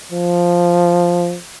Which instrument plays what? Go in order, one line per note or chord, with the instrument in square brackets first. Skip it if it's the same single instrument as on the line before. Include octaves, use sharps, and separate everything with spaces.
[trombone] F3